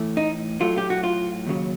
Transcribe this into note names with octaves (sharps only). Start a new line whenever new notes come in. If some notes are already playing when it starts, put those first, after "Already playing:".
Already playing: A2 E3 A3
D#4
A2 F#3 A3 F4
G4
F#4
F4
D#2 C#3 F#3